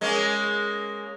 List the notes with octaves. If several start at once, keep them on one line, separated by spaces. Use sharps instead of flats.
G#3 A#3 C#4